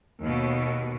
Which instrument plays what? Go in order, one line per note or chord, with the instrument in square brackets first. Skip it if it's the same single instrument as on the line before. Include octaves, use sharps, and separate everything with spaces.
[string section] D#2 B2